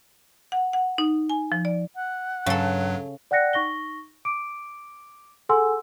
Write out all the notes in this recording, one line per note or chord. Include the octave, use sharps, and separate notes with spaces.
F#5
F#5
D#4
G#5
F3
D5
F#5
G2 C#3 F#3 A4
D5 F#5 G5 F#6 A#6 C#7
D#4 C#6 A#6 G7
D6 D7
G#4 A4 F#5 G#5 C6 E6